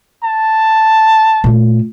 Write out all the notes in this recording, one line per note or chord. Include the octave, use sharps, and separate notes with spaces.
A5
A#2 A3